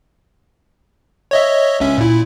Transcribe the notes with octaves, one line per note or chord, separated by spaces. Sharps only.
C#5 D#5 E5
C#2 C#4 E5
A#2 E4